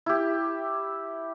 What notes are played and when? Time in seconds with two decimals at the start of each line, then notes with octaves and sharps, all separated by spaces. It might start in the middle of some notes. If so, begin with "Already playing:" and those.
0.06 E4 G4